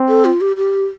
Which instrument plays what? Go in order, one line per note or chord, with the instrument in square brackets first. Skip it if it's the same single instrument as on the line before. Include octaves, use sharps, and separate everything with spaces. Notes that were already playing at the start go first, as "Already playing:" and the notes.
Already playing: [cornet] C4
[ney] A4
F4
G4
G4